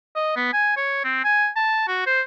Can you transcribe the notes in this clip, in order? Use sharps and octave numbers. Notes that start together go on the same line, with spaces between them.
D#5
B3
G#5
C#5
C4
G#5
A5
F#4
C5